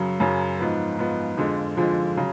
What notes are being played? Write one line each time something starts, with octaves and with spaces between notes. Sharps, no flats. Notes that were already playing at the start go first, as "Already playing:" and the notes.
Already playing: F#2 C#3 F#3
F#2 C#3 F#3
G#2 F3 B3
G#2 F3 B3
F2 D3 F3 G#3
F2 D3 F3 G#3
C#3 F#3